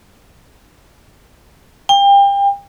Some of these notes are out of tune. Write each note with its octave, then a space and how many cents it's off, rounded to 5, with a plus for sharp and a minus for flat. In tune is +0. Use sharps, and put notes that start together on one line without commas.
G5 +30